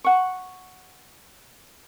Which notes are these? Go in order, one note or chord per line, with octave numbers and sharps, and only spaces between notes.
F#5 C#6